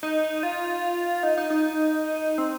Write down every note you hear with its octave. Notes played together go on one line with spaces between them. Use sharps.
D#4
F4
D#4
D#4
D#4
C4